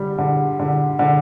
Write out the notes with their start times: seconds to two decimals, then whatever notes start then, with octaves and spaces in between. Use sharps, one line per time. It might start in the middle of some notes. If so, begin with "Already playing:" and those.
Already playing: D3 G3
0.18 D3
0.59 D3
0.99 D3